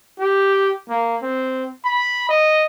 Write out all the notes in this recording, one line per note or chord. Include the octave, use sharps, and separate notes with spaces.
G4
A#3
C4
B5
D#5